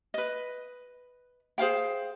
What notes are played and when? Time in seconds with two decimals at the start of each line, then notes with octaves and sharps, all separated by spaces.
0.14 B4 D#5
1.58 G#4 C5 F5 G5